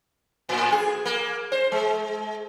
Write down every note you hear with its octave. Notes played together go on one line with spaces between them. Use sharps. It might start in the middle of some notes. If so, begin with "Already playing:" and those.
A2
G#4
A#3
C5
G#3